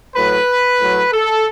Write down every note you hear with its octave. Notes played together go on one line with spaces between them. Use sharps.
A2 F#3 B4
A2 F#3
A4